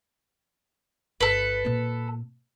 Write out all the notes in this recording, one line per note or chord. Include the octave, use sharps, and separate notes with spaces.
G1 A4 B4
A#2 C4